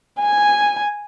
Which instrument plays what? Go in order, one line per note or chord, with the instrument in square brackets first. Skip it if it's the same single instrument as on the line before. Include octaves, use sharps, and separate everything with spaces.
[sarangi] G#5